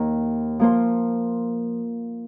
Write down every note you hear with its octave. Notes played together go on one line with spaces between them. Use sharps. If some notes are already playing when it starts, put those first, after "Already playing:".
Already playing: D#2 D#3 A#3
F3 A#3 F4 C5